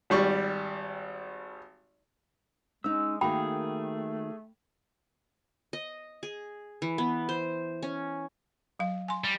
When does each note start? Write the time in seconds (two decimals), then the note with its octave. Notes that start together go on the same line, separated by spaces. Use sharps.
0.10 G#1 G3 C#6
2.84 G#3 C#4 D#4 E6
3.21 D#3 A3 A#3 F#4 G#4 G5 B5
5.73 D#5
6.23 G#4
6.82 E3
6.98 B3
7.29 C5
7.83 C#4
8.79 F#3 F5
9.08 G#5 C6
9.24 G3